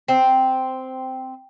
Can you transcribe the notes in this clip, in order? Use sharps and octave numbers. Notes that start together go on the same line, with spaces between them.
C4